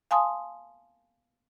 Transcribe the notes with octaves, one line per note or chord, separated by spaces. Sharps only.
F5 G#5 A5 C6 D#6